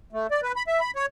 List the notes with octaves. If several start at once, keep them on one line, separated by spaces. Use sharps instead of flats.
A3
D5
B4
B5
E5
B5
C#5